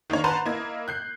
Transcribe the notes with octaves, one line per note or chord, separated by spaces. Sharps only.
D#3 A#3 D4 C#5
B4 C5 F#5 A5 A#5 C6
A#3 E4 D#5 G#6
F#6 G6 C7